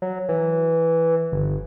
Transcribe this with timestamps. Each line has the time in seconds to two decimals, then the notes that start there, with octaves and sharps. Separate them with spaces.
0.02 F#3
0.29 E3
1.32 G1